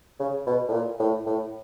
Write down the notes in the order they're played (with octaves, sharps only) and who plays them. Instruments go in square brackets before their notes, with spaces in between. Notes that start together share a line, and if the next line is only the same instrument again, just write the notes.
[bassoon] C#3
B2
A2
A#2
A2
A2